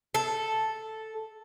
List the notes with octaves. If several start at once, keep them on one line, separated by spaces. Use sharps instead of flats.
A4